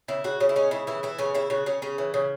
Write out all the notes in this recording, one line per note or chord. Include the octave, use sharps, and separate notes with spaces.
C#3 E4
C#3 F#4
C#3 C#4
E4
G#3 C#4
C#3 E4
E3 E4
E3 E4
C#3 C#4
C#3 E4
C#3 F#4
C#3 C#4
C#3 C#4
E3
C#3